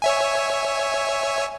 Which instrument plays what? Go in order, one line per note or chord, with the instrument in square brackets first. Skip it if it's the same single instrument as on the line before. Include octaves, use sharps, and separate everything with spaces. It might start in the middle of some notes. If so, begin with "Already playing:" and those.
[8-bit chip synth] C#5 E5 G#5